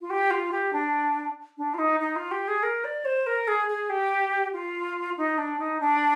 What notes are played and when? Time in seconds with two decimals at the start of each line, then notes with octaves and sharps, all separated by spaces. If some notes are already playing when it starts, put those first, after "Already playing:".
0.01 F4
0.10 G4
0.31 F4
0.52 G4
0.73 D4
1.58 D4
1.74 F4
1.78 D#4
2.00 D#4
2.16 F4
2.31 G4
2.48 G#4
2.63 A#4
2.84 D5
3.05 C5
3.26 A#4
3.48 G#4
3.68 G#4
3.90 G4
4.53 F4
5.17 D#4
5.38 D4
5.59 D#4
5.80 D4